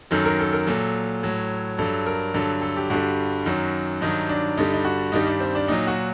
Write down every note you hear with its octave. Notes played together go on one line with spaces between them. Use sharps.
F#2 D#3 F#3 A4
A#4
A4
A#4
A#2 F#3 A4
A2 F#3
G2 F#3 A4
A#4
G2 D3 F#3 A4
A4
G4
G2 D3 G3 F#4
F#2 D#3 F#3
G2 D#3 F#3 D#4
D4
G2 D3 G3 D#4
D#4
F#4
G2 D#3 G3 D#4
D4
C4
D4
A#2 F#3 D#4
F#4